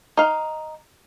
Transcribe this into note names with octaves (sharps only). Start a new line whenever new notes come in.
D#4 F5